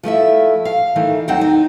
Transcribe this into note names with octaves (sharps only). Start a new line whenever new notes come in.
F3 A3 E4 E5
F5
D#3 E3 A3
D#2 F#3 C4 D#4 F#5 G5
D#4